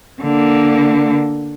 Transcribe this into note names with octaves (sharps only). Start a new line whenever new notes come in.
D3 A#3